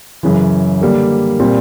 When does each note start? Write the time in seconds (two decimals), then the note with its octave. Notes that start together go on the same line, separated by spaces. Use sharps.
0.23 F#2 C#3 E3
0.81 D3 G3 A#3
1.40 A#2 G3 C4